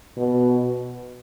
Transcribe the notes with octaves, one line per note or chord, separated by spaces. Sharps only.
B2